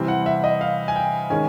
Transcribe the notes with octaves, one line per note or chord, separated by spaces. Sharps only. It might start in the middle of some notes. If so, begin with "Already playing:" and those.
Already playing: C3 E3 G3 C4
F#5
E5
D#5
F5
G#5
G5
D#3 G#3 C#4 G#5